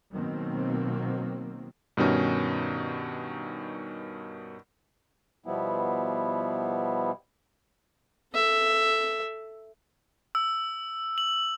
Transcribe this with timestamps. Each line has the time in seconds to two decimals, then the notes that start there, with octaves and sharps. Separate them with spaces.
0.13 B2 D#3 F#3 A#3 C4
1.97 G2 B2 D#3 C#4 D#4
5.46 B2 F3 G3 B3 E4
8.34 A4 E5
10.35 E6
11.18 F#7